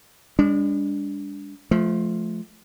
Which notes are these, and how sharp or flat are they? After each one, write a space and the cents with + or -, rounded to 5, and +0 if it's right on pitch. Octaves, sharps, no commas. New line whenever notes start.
G#3 -45 D4 -25
F3 +0 A3 -25